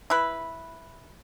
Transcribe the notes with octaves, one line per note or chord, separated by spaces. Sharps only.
E4 B4